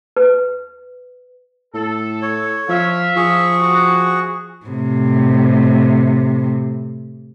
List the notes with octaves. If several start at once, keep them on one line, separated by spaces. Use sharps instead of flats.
B4
A2 A4
C#5
F3 E5 F5
F3 G#4 C#6
F#4
A2 C3